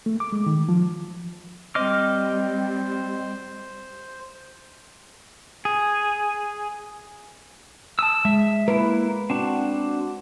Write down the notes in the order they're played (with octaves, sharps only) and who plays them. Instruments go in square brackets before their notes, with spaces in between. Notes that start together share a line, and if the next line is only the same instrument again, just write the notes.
[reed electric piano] A3
D6
G#3
D#3
F3
[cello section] G3 [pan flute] C4 [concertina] C5 [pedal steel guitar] D#5 D6 F6
[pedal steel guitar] G#4
A5 D#6 E6
[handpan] G#3 [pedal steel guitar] E5
[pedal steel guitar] A#3 E4 [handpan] B4
[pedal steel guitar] C4 D4 F#4